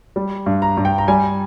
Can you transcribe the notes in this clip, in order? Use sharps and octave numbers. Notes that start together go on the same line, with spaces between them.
G3
G2
A#5
G2
G5
A#5
G3 G#5